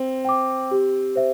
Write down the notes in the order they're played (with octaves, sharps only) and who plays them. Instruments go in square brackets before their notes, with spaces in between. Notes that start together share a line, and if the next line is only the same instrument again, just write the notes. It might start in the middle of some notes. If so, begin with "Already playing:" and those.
Already playing: [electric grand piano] C4 [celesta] C5
[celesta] G5 D6
G4
C5 E5